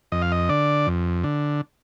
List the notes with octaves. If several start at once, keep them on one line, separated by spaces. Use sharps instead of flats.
F2 D#5
F5
D#5
D3 D5
F2
D3